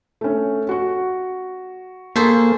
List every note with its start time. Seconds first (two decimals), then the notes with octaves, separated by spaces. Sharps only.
0.21 A3 C#4
0.69 F#4 C#6
2.16 A#3 G#4 A4 C5 C#6 G6 B6